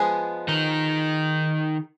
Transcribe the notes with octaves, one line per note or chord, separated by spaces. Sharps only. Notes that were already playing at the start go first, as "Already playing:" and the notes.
Already playing: F3 G#3 B3 G#4
D#3 D#4